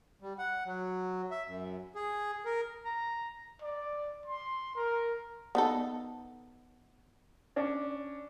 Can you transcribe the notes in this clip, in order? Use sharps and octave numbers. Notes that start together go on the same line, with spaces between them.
G3
F#5
F#3
E5
F#2
G#4
A#4
A#5
D5
C6
A#4
B3 D#4 A4
C#4 D4